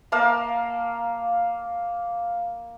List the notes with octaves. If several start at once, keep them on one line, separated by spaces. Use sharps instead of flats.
A#3 A#4 F5 A5